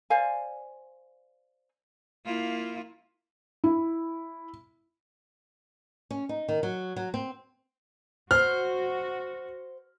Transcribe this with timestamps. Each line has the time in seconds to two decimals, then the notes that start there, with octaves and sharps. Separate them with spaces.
0.10 C5 D5 F5 G#5
2.25 A#3 E4 F4
3.64 E4
6.11 C#4
6.29 D#4
6.48 D#3
6.63 F#3
6.96 F#3
7.14 C4
8.31 F#4 C5 F6